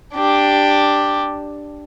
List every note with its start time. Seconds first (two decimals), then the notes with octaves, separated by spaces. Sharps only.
0.14 D4 G4